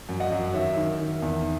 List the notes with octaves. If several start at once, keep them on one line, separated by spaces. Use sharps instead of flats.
F#2
D#5 F#5
F#2
D#3 C#5 E5
D#3
D#3
E2